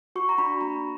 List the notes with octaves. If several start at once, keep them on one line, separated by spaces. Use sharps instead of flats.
F#4 C#6
A#5
D4 B5
A#3 A#5